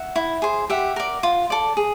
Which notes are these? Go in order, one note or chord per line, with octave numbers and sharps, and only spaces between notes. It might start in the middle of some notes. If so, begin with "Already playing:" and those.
Already playing: E5 F#5
E4
G#4 C5
G4 E5 F#5
A#4 D5
F4
A4 D5
G#4